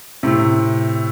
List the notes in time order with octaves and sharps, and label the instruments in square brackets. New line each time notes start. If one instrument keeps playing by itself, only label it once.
[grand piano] A2 C3